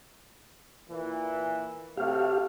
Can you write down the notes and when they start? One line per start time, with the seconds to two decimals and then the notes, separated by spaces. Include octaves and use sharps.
0.90 A#2 E3
1.97 C3 F#3 A3 G4 F5